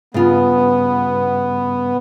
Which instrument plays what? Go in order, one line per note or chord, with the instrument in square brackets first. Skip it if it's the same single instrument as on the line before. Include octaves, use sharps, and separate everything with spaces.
[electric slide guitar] G2 [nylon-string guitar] C#3 F4 [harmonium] B3